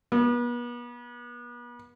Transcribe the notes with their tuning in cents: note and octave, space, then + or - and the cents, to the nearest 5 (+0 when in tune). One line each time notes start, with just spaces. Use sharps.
B3 -40